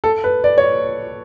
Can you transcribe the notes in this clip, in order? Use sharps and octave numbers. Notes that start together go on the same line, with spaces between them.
A4
B4
D5
C#5